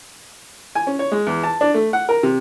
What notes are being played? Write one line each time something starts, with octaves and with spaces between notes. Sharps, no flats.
G#5
C#4
C#5
G#3
E2
A5
D4
A3
F#5
A#4
C3